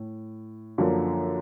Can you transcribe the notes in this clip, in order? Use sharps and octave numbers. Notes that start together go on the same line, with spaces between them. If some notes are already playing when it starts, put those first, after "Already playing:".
Already playing: A2
F#2 D3 F3 A#3